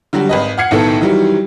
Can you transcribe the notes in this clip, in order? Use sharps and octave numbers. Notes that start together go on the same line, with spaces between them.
D3 F#3 G3 F#4
G#1 B4 D#5
F#5 F6 G#6 C7 C#7
B1 A2 D#3 B3 A4 C#7
D#3 E3 F#3 G3